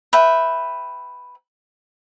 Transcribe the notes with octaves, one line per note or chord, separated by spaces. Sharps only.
B4 E5 G5